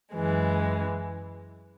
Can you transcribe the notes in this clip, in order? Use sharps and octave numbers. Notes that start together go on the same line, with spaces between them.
F#2 E3 G#3